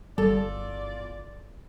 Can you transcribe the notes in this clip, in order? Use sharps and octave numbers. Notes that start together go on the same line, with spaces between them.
G1 E2 G3 F4 A4 D5